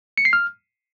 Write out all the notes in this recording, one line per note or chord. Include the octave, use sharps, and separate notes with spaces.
C#7
C7
F6